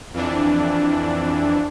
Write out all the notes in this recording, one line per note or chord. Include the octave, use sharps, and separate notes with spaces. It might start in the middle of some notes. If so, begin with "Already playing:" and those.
F2 E3 D4